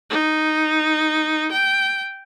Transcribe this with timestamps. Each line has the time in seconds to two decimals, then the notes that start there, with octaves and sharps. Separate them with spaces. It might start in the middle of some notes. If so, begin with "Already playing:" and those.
0.10 D#4
1.52 G5